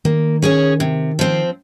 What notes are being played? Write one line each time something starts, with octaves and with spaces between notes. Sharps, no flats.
D#3 A#3
C#4 G#4 C#5
C3
F3 C4